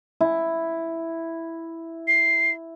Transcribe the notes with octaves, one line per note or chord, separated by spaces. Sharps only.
E4
C7